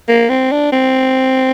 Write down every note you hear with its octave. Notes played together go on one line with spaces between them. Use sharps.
A#3
C4
D4
C4